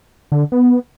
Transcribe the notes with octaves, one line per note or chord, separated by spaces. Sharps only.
D3
B3